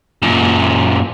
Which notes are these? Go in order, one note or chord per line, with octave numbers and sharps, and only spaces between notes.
F#2 A#2